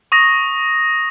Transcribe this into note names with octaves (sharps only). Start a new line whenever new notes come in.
C#6 D#6 A#6